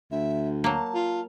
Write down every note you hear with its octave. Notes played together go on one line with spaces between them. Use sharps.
D2 E5
F#3 A#3 A5
F4